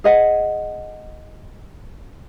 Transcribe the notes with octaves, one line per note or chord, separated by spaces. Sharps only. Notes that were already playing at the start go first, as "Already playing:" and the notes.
G#4 D#5 F#5